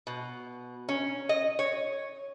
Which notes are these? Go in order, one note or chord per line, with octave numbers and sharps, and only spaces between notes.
B2
C#4
D#5
C#5